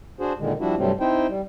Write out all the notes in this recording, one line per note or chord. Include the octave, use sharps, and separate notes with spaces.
D4 F#4 G#4 C5
A#2 D3 D#3 G#3
F3 G3 D4 E4 F#4
G2 C3 F#3 G3 A3 C4
C4 D#4 E4 C5 G5
G3